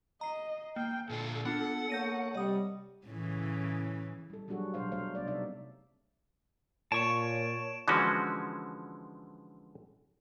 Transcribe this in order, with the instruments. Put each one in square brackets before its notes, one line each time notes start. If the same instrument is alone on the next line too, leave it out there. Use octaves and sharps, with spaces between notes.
[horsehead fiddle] D#5 [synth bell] A#5 C7
[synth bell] A#3 [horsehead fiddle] G5
[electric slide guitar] A#2 D3 F4 [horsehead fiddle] A4
[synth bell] B3 D4 F4 [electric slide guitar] F#5
[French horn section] A#3 C#5 [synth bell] G6 A#6 D#7
[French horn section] C3 G3 [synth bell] D#5 D#6
[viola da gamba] A2 C#3 E3
[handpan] G3 A4
F#3 G3 D4 F#4 G#4 A4
B2 F#3 G3 D4 C5 F5
A3 D4 C5 F5
C3 B3 D4 D5
C3 G3 D#4 D5 E5
[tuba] A#2 [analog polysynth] C#5 [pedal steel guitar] A5 C#6 [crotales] D7 E7
[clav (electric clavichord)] D3 E3 F3 G#3 C#4 F#4